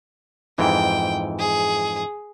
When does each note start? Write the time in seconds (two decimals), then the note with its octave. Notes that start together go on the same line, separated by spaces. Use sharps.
0.58 F2 G#2 E3 G5
1.39 G#4